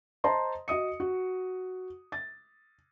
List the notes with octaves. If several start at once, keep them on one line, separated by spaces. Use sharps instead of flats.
C5 D#5 A5 A#5 C6
F#4 D#5 D#6 C#7
F#4
A6